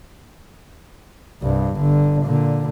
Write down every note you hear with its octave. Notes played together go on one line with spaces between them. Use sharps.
C2 G2
G1 D3
A#2 D3